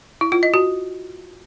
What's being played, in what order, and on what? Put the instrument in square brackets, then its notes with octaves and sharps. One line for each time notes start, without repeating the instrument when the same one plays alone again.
[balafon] E4
F4
D#5
F#4